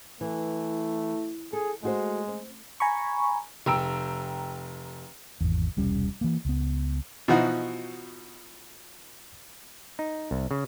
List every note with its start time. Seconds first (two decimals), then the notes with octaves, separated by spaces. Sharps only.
0.21 E3 A3
1.53 G#4 A4
1.83 G#3 A3 F#4 C5
2.28 C4
2.80 G#5 A#5 B5 C#6
3.66 F1 G5 A#5 E6 D7
5.41 G#1 E2
5.77 E1 C2 G3 C#4
6.21 E3 A#3
6.45 C#2 B3
7.28 B2 E3 F3 D#4 F#4
9.99 D#4
10.31 C2
10.51 C#3